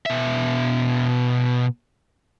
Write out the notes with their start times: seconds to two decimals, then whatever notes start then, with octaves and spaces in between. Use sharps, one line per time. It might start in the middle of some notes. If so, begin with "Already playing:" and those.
0.06 B2 E5